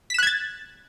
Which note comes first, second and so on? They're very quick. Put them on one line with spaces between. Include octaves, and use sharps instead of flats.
B6 E7 F#6 G#6 A6